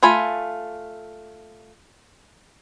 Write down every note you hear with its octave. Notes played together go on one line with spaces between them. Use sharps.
A3 F4 G#5 B5